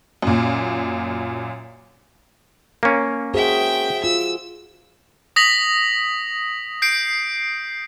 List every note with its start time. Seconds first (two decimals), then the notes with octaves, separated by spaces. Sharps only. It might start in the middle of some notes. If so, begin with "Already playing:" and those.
0.22 F#2 A#2
2.83 A#3 C#4
3.34 F#4 G#4 C5 E5 G5
4.04 F4 E6
5.36 D#6 A#6 B6 F#7
6.82 G6 C7 D7